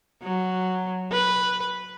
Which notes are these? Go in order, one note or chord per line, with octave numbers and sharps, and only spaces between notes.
F#3
B4